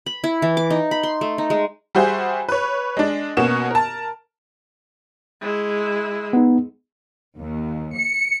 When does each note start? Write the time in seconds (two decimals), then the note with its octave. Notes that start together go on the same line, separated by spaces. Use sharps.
0.06 B5
0.24 E4
0.42 E3
0.57 D6
0.70 D#4
0.91 B5
1.03 C6
1.21 A3
1.38 D#4
1.50 G#3
1.95 G3 F#4 G#4 C5 E5
2.49 B4 C#5
2.97 G#3 D4
3.37 B2 A#3 C#4 F#4 E7
3.70 A#4 A5
5.41 G#3 E4
6.33 B3 D#4
7.39 D#2
7.96 C#7